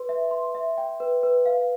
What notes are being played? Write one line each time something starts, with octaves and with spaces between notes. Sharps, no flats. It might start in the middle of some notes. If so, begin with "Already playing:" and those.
Already playing: B4 C6
E5
C6
E5
G5
B4
B4
F5